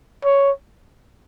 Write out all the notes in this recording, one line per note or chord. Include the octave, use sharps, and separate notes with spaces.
C#5